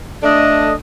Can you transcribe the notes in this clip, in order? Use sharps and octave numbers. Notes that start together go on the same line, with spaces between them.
A3 D4 D#5